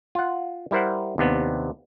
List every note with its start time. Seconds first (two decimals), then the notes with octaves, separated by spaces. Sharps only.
0.15 F4 F#5
0.71 G3 E4 A#4 C5 F#5
1.18 D#2 C3 B3 D4